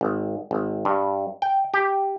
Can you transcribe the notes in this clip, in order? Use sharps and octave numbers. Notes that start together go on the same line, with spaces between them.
G#1
G#1
G2
G5
G4